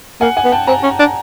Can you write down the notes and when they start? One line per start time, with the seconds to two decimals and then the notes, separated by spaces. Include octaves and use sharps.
0.21 A#3 F#5 G#5
0.37 F#5 G#5
0.45 B3
0.52 G5 A5
0.67 C4 G#5 A#5
0.83 C#4
0.99 D4